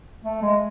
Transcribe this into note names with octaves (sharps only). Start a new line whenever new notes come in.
A3
G#3